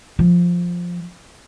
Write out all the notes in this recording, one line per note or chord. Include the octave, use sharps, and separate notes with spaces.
F3